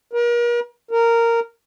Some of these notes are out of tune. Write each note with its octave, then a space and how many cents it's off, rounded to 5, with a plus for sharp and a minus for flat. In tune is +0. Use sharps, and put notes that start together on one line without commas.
A#4 +40
A#4 -10